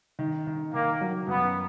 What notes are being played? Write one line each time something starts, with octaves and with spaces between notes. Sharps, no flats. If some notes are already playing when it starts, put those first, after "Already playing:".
D#3
D#3
D#3 A#3
F#3
F#2 B3